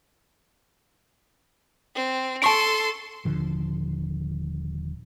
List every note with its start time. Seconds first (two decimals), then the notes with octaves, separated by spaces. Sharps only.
1.95 C4
2.42 A4 A5 C6 C#6 D7
3.25 D#1 D3 F3